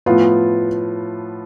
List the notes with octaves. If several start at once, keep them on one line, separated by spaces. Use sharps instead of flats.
A2 F3 B3 F4